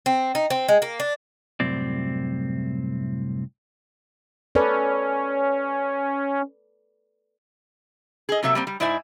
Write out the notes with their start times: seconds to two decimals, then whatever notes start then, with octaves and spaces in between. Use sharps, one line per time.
0.06 C4
0.35 D#4
0.50 C4
0.68 G#3
0.82 A#3
1.00 D4
1.60 C2 F#2 A2 C4 D5
4.55 C#4 A4 B4 D5
8.29 G#4 D#5
8.43 C3 F#3 A#3 A4 E5
8.55 G3 A#3 C4
8.67 G3
8.80 G#2 E4 C5 D5 E5 G#5